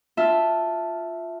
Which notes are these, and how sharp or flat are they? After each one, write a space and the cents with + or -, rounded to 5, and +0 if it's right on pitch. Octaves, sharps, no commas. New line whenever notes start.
F4 +0 E5 +0 A5 +0